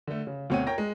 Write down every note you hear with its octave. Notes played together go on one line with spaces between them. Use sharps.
D3 A3
C#3
D2 B2 C4 C#5 F#5 D#7
A#4 C#5 G5 A#6
G#3